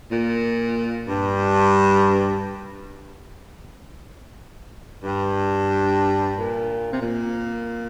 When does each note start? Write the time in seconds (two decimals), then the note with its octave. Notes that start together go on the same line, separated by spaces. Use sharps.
0.10 A#2
1.08 G2
5.04 G2
6.36 A#2
6.92 C3
7.01 A#2